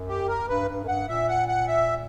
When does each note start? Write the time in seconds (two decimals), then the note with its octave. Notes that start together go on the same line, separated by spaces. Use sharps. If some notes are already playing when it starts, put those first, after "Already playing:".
Already playing: F#2
0.09 G4
0.28 A#4
0.49 G2 B4
0.69 G2
0.84 F#2
0.88 G2 F#5
1.09 A#2 E5
1.28 F#5
1.48 F#5
1.68 E5